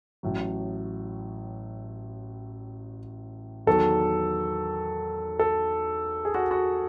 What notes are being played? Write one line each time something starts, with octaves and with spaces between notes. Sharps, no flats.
A1 A2 F#3
E2 D#3 F#3 A4
A4
G#4
F#4
F#4